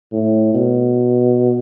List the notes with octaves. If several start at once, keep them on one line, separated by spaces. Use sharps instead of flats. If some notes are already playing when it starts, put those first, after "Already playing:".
A2
B2